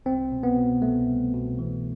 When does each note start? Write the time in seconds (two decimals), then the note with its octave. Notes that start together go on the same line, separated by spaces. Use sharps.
0.06 C2 C4
0.32 B2
0.43 B3
0.57 B2
0.82 C2 A3
1.08 C2
1.34 B2
1.59 E3